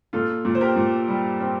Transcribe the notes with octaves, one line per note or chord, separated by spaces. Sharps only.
A#2 F4 A4
A#2
C5
G4 A#4
A#2
G3
C4